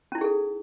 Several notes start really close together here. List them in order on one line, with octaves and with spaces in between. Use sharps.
C#4 E4 D#4 G#4 A4